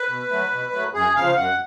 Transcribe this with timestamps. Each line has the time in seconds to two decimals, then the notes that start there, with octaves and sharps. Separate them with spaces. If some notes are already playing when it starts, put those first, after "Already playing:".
Already playing: B4
0.08 B2
0.30 F#3 A3
0.52 B2
0.72 F#3 A3
0.94 F#2 G#4
1.16 C#3 F3 F5
1.36 F#2 F#5